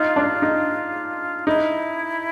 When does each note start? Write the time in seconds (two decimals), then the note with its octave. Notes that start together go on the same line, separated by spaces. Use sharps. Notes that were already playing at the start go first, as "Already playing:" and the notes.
Already playing: D#4 F4
0.16 D4
0.42 D#4
1.47 D#4 E4